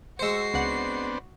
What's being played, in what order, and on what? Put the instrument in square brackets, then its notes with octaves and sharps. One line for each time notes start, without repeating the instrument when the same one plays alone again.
[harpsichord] G#3 C5 [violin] F#4 C7 [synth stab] E6 C#7
[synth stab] C#2 F#5 [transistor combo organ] B3 C4 D4